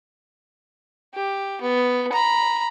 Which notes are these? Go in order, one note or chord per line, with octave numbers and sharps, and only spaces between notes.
G4
B3
A#5 B5